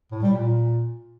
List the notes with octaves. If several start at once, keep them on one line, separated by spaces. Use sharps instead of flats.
A2
G3
A#2